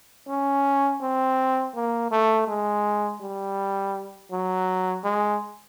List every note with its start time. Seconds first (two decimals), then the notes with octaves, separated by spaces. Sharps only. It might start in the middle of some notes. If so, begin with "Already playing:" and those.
0.28 C#4
1.01 C4
1.74 A#3
2.11 A3
2.47 G#3
3.21 G3
4.31 F#3
5.04 G#3